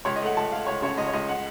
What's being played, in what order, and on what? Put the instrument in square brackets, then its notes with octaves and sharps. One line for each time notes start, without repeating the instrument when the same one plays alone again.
[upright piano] C#2 C#5
D#5
A3 F#5
C#2 A5
A3 F5
C#2 C#5
C#3 C#5
C#2 D#5
C#5
C#2 D#5
F#5